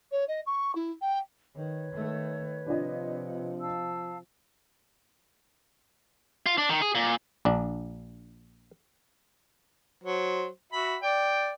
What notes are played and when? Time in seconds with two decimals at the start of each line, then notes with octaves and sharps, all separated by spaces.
0.11 C#5
0.28 D#5
0.46 C#6
0.75 E4
1.02 G5
1.55 D#3 B4 C#5
1.93 D#3 A3
2.67 C3 F3 D4 F4 D#5
3.60 F5 A5 E6
6.46 F4
6.58 D4
6.69 D#3
6.82 G#4
6.95 A#2
7.45 A#1 D4
10.04 F#3 C5
10.73 F#4 E5 B5
11.03 D5 G5